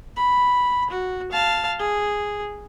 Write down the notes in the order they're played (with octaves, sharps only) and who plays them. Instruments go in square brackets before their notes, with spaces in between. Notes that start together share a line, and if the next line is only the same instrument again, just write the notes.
[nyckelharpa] B5
F#4
F5 A5
G#4